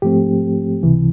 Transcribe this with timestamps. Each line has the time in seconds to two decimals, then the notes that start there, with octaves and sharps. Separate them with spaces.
0.02 G#2 F3 A3 C4 G4
0.83 C#2 C3 E3